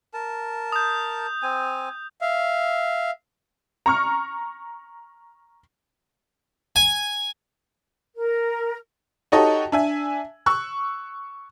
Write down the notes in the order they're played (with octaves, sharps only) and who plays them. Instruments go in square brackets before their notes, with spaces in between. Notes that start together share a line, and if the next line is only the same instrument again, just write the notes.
[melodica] A#4 A5
[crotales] D#6 G6
[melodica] C4 G#5
[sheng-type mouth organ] E5 F5
[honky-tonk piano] A#5 C#6 F6
[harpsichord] G#5
[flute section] A#4
[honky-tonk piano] D#4 F#4 G4 A4 C#5 D#5
D4 E5 G#5
C#6 E6 F#6